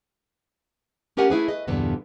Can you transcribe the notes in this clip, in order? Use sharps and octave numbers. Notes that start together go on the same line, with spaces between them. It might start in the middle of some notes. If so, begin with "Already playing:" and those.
A3 C#4 G4 A#4 F#5 G#5
A3 E4 G#4 B4
B4 D#5
E2 G2 A#2 D3 B3